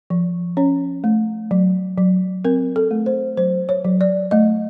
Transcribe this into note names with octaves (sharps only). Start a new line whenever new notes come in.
F3
C#4 C#5
A3
F#3
F#3
C4 A#4
A4
A3
C5
F#3 C5
C#5
F#3
D5
A3 D#5